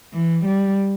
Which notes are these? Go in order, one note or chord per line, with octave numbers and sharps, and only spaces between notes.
E3
G3